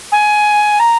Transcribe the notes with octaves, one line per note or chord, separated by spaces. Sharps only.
G#5
A#5